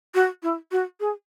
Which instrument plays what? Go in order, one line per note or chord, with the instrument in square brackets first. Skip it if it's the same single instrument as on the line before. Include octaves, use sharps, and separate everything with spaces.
[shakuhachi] F#4
E4
F#4
G#4